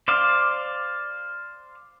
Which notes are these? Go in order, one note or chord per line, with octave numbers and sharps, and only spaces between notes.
C5 D5 F5